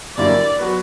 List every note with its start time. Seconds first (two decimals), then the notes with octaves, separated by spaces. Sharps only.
0.17 F#2 D3 G3 A#3 E4 D5
0.59 F#3 B3 F#4 B4